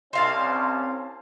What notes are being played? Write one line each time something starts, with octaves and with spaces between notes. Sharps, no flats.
C2 C4 C#4 F5 A5